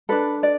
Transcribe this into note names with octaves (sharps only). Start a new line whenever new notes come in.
D4 A4 B4
D5